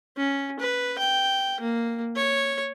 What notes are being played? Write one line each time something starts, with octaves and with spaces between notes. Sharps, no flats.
C#4
B4
G5
A#3
C#5